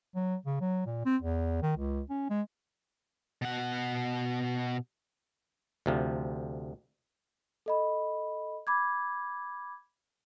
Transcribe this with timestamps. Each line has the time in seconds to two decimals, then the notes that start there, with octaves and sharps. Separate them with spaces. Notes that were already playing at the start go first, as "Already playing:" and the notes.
0.15 F#3
0.46 C#3
0.60 F#3
0.86 A#2
1.05 C4
1.22 E2
1.62 D#3
1.76 C#2
2.10 C#4
2.30 G#3
3.42 B2 F#5
5.86 D2 C3 F3
7.66 A4 D#5 B5
8.67 B5 D6 G#6